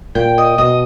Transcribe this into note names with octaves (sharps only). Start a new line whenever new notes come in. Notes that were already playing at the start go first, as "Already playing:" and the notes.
A#2 G5
D#5
B2 D#5